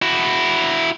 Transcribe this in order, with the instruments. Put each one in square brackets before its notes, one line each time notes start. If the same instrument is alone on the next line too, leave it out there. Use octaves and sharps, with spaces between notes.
[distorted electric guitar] E4 F#4